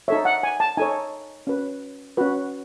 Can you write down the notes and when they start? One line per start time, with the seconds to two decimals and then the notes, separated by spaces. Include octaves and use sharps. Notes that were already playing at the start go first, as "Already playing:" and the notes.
0.08 D#4 A4 C#5 E5
0.25 F#5
0.43 G#5
0.60 A5
0.77 D#4 A4 C#5 G#5
1.47 C#4 F#4 B4
2.17 C#4 F#4 B4